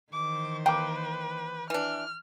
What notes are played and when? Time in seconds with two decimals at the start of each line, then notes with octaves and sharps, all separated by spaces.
0.12 D#3 E3 C5 D6
0.66 A#3 B4 G5 D6
1.70 E3 D4 F6